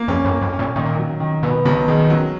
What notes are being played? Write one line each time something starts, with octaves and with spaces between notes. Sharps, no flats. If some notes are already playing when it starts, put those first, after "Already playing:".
Already playing: A#3
F2 C#4
F#2
A#3
F#2
C#4
A#2
A#2 D#3
F#3
D#3
B2 B3
B1 C#3
D#3 G#3
F#3